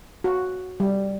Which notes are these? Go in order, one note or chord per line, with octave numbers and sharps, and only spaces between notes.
F#4
G3